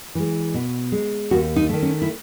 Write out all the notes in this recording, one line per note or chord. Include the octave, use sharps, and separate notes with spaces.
E3 G#3
B2
G#3
D#2 F#4
D#4
D#3 A3
C#4
E4